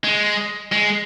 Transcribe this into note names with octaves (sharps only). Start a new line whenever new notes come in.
G#3
G#3